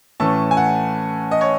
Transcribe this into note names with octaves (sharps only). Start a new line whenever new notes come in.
A2 E3 A3 C#4 A5
G#5
F#5
D#5
C#5